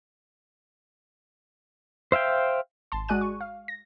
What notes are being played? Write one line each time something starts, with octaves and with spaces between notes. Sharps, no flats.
C5 E5 F5 G5
G#1 A5 C6
G#3 F#4 D5 G#5 F#6 D#7
C#6
F5
A#6